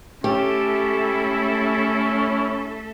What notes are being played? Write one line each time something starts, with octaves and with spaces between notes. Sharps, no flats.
A3 C#4 E4 G4 A4 E5